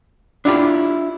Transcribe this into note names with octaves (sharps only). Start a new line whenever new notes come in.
D4 E4 F4 G4